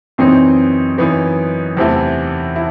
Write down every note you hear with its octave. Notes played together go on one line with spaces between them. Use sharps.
F#2 E3 B3 C4 D#4
F#2 E3 B3 D#4
E2 C3 E3 A3 E4
E4